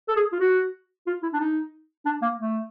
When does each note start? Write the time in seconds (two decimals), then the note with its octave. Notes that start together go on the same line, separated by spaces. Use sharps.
0.08 A4
0.16 G#4
0.32 F4
0.40 F#4
1.07 F4
1.23 E4
1.33 D4
1.40 D#4
2.06 D4
2.22 A#3
2.38 A3